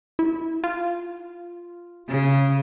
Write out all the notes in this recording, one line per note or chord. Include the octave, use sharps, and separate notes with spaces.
E4
F4
C#3